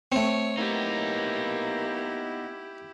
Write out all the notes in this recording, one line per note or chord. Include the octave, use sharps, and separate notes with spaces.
A3 C4 C#5
A#3 B3 D#4 E4 G4